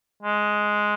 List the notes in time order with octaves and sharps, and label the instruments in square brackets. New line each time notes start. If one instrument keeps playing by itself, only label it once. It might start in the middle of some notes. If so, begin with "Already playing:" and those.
[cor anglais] G#3